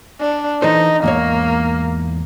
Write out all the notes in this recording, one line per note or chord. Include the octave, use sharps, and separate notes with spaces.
D4
E3 D#4 A4 C5
E2 G#2 A#3 C#5